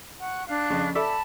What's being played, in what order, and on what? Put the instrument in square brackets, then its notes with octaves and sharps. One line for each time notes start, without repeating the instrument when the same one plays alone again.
[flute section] F#5 C#6 F#6
D4 F5 F#6
[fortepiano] F2 C#3
[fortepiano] A4 D5 E5 [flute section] A5 B5